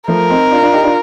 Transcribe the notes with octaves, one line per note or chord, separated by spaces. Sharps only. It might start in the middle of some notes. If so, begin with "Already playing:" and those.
F3 A3 A#4
C4 D#4
D4 F4
D4 F4
D#4 G4
D4 F4